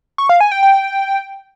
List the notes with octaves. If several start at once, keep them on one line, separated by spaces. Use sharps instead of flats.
C#6
F5
G#5
G5
G5